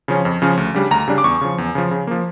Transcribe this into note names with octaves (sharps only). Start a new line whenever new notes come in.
C#3 F3 C#4
F2
C#3 F3 C#4
D2
C#3 G3 D4
D2 A#5
C#3 G3 D4
D6
E2 C#6
C#3 F3
E2
C#3 F3
C#3
F3 A#3